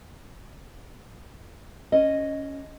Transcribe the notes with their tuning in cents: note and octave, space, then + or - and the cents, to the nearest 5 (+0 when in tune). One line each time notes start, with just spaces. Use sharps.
C#4 +0 D#5 +0